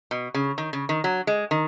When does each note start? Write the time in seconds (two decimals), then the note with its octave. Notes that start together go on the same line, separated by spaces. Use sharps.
0.11 B2
0.34 C#3
0.58 D#3
0.73 C#3
0.89 D#3
1.04 F#3
1.27 G#3
1.51 D#3